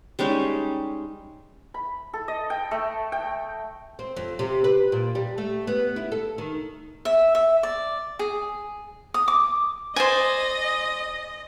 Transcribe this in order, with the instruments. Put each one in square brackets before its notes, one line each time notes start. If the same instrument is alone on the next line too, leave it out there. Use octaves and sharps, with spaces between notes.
[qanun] G3 G#3 C#4 D#4
[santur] B5
A4
D#5
G5
A3
G5
[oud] C4
F2
C3
B4
A#2
G3
A3
B3
E4
A4
D#3
[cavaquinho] E5
E5
D5
G#4
D#6
D6
[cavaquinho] C5 D5 G#5 [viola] D#5